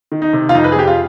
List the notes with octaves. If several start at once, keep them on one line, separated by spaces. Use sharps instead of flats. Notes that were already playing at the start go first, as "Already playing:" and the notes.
D#3
D#4
C3
F4
F2 D#4
B4
G#4
F2 G4
F4